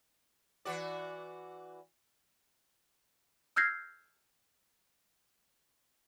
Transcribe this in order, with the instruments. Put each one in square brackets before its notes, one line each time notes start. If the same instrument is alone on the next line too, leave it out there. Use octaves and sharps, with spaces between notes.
[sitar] E3 F#4 D5
[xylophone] E6 F6 G6 G#6 A#6 C7